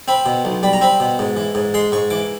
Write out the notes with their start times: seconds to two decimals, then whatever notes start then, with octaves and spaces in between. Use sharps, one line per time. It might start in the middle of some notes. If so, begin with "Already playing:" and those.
0.08 C4 B5
0.26 B2
0.45 B1
0.63 G3 B5
0.73 A#5
0.81 C4 B5
1.00 B2
1.19 G#2
1.37 E3
1.55 G#2
1.74 G#3 C6
1.92 G#2 C#6
2.10 E3 D6